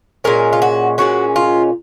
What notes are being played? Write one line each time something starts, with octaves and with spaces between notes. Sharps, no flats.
A#2 G#3 C#4 A#4
F4
F#4
A#2 G#3 C#4 F#4
F4